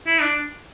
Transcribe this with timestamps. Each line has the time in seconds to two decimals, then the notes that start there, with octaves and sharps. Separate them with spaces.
0.07 E4
0.21 D4